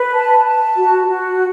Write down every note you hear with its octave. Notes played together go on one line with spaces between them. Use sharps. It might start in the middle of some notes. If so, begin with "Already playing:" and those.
Already playing: B4
A5
A5
F#4
F#4